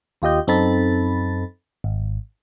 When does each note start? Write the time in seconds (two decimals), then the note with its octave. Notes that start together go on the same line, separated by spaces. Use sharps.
0.22 D#2 F4 G4 D#5 G6
0.47 F#2 C4 D#4 A4 B5 A6
1.84 G#1